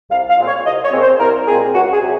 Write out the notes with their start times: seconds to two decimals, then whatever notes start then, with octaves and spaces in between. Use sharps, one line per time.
0.10 C2 F5
0.29 F5
0.38 A#2 G#3 C4
0.47 C#5
0.65 C2 D#5
0.84 C#5
0.92 A#2 G#3 C4
1.02 C5
1.20 C2 A#4
1.47 A#2 G#3 C4 G#4
1.74 C#2 F#4
1.93 G#4
2.03 C3 F#3